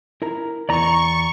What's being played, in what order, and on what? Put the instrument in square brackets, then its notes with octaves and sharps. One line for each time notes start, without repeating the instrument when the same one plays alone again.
[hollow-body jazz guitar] E4 A#4 A#5
[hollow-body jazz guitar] E2 E4 [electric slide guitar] D5 A#5 [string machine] C#6